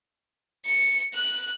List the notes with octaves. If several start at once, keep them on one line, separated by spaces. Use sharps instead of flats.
C#7
F#6